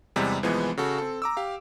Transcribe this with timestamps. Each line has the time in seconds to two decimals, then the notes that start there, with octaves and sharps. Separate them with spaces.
0.16 E2 C3 G3 G#3
0.43 C2 E3 F3 G#3 B3
0.77 C#3 F#4 A4
0.98 C4 A4
1.22 A#5 D6 E6
1.37 G4 F5